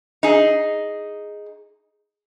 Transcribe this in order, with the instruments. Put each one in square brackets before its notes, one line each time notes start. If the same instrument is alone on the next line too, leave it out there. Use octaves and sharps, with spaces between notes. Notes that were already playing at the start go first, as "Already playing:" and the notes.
[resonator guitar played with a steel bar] D#4 G#4